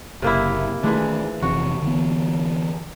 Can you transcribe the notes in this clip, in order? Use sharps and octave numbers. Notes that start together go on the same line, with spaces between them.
F#1 C3 A#3 E4
D#3 E3 G#3 A3 D4
F1 C3 E3 F#4
D3 E3 B3